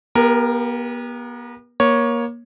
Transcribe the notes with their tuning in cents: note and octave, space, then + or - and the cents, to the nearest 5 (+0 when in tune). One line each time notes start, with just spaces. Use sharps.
B3 -40 G4 +25 A#4 +0
A#3 +25 C#5 +0